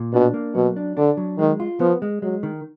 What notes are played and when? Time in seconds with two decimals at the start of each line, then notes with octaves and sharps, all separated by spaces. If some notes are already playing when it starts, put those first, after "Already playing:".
Already playing: A#2
0.14 B2 D4
0.34 A#3
0.55 B2 F#3
0.76 D4
0.97 D3 D4
1.17 F#3
1.39 D#3 G#3
1.60 F4
1.80 F3 B3
2.02 G#3
2.22 F#3 G#3
2.43 D#3